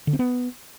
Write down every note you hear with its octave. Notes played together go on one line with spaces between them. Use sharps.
D3
C4
B3